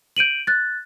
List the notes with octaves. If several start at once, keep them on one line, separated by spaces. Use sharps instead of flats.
G6 D7 D#7 F#7
F#6 A6